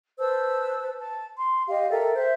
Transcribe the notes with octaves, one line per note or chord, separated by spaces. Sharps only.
B4 C5 A5 E6
A5
C6
G4 D#5 F5
A4 A#4 E5 G5
C5 E5